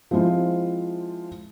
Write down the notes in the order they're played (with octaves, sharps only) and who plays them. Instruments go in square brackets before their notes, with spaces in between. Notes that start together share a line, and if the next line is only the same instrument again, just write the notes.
[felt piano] F3 G#3 C4 E4 F4